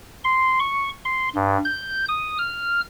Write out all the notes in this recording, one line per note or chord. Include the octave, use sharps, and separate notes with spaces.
C6
C#6
C6
G2
G6
D#6
F6